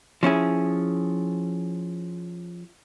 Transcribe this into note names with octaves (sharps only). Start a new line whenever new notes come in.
F3 C#4 E4 G#4